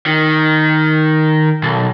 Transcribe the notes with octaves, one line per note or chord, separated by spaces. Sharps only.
D#3
B1